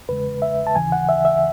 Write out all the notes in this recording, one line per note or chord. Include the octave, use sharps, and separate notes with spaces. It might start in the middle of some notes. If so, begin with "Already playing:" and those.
E2 C#3 G#3 B4
E5
A5
D#2 C#3 E3 G#5
F#5
E5
E5